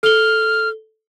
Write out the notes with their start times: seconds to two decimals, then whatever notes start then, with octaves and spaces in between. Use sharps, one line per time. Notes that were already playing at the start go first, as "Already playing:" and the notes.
0.03 A4 F6 G7